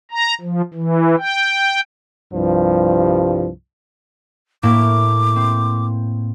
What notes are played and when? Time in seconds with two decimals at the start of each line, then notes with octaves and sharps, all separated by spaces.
0.12 A#5
0.41 F3
0.74 E3
1.18 G5
2.34 C2 G2 F3
4.63 A2 A#3 E4 D6
5.36 C4